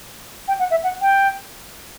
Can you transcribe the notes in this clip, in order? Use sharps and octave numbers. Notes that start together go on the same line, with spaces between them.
G5
F#5
E5
F#5
G5